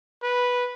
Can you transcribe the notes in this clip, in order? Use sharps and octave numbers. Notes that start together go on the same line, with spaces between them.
B4